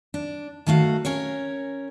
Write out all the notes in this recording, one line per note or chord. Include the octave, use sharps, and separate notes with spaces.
D4
D#3 A3 F#4 F5
C#4 A#4 C#5